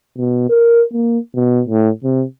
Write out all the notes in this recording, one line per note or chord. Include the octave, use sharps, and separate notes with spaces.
B2
A#4
A#3
B2
A2
C3